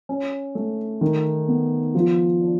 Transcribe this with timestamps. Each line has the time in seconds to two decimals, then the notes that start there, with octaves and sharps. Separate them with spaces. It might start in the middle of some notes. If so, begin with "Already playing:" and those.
0.09 C#4
0.55 A3
1.01 D#3
1.48 B3
1.95 F3
2.41 D4